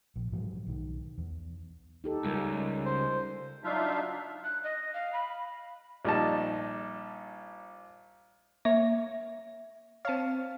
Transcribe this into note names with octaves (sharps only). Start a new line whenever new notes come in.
A#1
G#2 E3 F#3 G#3
B1 D#3
E2
D#4 G4 A4
C#2 C#3 G3 A#4
C5
F#3 D4 D#4 F4 E5 F5
F#6
D#5
F5
B5
A#1 G3 D#4 A5
A#3 C#5 E5
C4 C#5 F5 A5